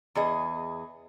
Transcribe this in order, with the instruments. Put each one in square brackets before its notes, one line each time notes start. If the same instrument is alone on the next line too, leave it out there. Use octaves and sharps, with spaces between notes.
[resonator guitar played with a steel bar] E2 G#4 D#5